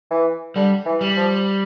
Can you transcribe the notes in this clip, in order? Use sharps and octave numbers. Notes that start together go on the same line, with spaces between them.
E3
D3 G3
E3
G3
F3